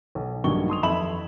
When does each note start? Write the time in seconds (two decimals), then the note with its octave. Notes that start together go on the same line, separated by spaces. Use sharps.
0.15 B1
0.44 A#1 G2 D#3 F#3 C#6 G7
0.70 C6 D#6 F7
0.83 F2 E3 E5 B5 E7 F#7